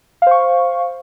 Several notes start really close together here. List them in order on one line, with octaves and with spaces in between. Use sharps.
F5 C5 C#6